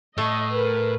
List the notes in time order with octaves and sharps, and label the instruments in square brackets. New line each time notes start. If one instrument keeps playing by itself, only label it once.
[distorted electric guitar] A2 [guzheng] A3 [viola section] D#5
[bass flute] A#4 [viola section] B4